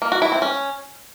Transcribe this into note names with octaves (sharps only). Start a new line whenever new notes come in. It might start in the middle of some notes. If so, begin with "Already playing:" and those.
A#3
F#4
E4
C4
C#4